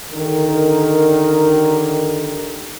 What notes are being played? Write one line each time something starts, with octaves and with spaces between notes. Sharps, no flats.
D3 D#3 G4 A#4